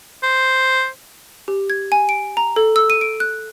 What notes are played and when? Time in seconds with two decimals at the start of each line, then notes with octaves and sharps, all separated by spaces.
0.23 C5
1.48 G4
1.70 G#6
1.92 G#5
2.09 D7
2.37 A#5
2.56 A4
2.76 E6
2.90 D#7
3.01 D7
3.20 F#6